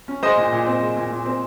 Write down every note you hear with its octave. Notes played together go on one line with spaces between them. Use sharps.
C#4
G#3 C5 D#5
A#2
A#2
C4
G#3
A#2
A#2
C4